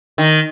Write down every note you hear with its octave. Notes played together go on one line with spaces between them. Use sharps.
D#3